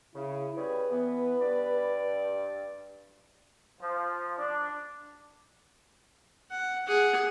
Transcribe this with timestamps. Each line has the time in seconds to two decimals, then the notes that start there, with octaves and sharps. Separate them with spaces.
0.14 C#3 E4
0.56 C#3 G3 G#4 B4
0.90 E3 B3
1.40 G2 D5
3.81 F3
4.38 D4
6.51 F#5
6.87 G#4 F#5